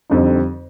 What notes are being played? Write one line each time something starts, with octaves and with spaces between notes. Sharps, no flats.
F2 D3 G3 C4 D#4